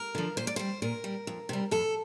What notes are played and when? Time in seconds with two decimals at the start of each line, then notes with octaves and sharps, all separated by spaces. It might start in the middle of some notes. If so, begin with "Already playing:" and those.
Already playing: A#4
0.15 D3 F3
0.37 A#2 C5
0.47 D5
0.56 G3 C5
0.82 A#2 A#4
1.04 G3
1.27 F2
1.49 C3 G3
1.71 F2 A4